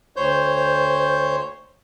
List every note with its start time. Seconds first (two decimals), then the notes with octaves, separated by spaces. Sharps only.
0.16 D2 C5 C#5 G6